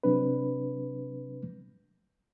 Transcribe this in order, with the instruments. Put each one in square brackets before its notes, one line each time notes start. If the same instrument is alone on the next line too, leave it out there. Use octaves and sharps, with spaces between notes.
[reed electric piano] C3 F#3 C4 D4 B4